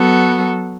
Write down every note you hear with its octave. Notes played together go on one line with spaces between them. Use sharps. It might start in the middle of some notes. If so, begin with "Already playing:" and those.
Already playing: F#3 B3 F#4 A4